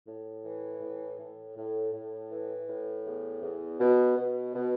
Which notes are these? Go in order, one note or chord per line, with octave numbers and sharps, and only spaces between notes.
A2
E3
A2
A2
A2
A2
E3
A2
E2
E2
B2
B2
B2